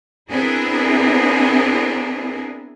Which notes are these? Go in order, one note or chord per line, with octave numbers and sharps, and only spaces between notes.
B3 C4 D4 E4 G#4 A#4